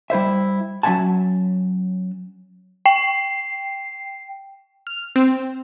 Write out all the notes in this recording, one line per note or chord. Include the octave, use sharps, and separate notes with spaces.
G3 E4 C5 E5
F#3 C#4 E5 F#5 G#5 A5
G5 C7
F6
C4